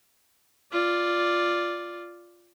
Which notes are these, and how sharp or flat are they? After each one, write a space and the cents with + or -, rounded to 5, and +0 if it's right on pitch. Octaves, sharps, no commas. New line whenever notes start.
F4 +0 D5 +0